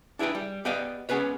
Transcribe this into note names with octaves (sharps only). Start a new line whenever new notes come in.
D4 E4 G#4 B4 G5
G3
B3 G4 D5 D#5 F5
B3 C#4 G#4 B4 C#5